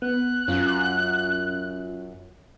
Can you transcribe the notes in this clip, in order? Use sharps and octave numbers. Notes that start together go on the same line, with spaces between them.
B3 F#6
F#2 C#4 F4